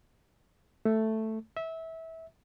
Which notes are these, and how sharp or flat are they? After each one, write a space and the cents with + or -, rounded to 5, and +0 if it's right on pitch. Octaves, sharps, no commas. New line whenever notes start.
A3 +0
E5 -20